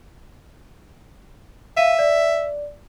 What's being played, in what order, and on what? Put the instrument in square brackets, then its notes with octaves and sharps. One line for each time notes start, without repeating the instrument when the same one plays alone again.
[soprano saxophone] E5 [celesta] F5 D#7
[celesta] D5